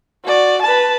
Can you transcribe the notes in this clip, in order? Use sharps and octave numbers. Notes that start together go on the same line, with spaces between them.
F#4 D5
B4 A5